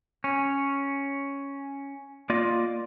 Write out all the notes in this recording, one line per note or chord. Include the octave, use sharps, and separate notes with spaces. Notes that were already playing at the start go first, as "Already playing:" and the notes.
C#4
A#3 F4 D5 D#5